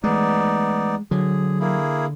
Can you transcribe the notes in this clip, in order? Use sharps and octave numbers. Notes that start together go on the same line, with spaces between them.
E3 G#3 A3 B3 D#4 D5
D3 F#3 G#4
A#3 E4 G#4